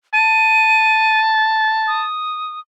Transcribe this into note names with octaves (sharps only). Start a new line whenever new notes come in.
A5 D#7
D#6